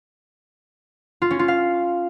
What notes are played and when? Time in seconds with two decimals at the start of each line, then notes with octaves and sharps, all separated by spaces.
1.22 F4
1.30 C#4
1.39 F4
1.48 F5